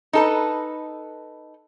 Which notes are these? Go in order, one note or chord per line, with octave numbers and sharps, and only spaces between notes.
D#4 A4 B4